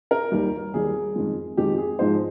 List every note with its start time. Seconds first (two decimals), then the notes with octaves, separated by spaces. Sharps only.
0.11 A#4
0.32 D#2 D#3 G3
0.74 D#2 D#3 G3 G#4
1.16 F2 D#3 G#3
1.57 F2 D#3 G#3 G4
1.78 G#4
1.99 G#2 F3 G#3 D#4 C5